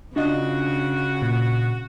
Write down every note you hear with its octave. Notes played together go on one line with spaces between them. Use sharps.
C#3 D4 F4 F#4 D#5
A#2